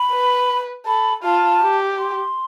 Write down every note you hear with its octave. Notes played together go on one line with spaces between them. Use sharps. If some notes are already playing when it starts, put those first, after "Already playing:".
Already playing: B5
B4
A4 B5
F4 A5
G4
C6